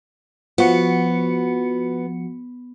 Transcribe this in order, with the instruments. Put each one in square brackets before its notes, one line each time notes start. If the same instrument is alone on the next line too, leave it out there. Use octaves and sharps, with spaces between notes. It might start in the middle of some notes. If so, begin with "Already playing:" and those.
[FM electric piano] F3 F#4 C#7 [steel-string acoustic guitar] B3